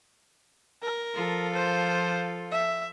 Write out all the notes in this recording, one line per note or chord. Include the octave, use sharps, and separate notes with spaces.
A#4
F3 F4 A4
C5
E5